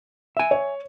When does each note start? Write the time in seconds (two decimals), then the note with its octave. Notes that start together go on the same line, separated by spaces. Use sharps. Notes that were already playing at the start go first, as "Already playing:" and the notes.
0.37 E5 G#5
0.51 C#5